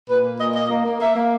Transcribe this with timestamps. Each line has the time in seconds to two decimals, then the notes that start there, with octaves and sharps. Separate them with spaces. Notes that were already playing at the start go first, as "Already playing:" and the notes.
0.09 A#2 B4
0.24 A#3
0.40 A#2 D#5
0.55 A#3 D#5
0.70 A#3
0.85 A#3
1.00 A#3 E5
1.15 A#3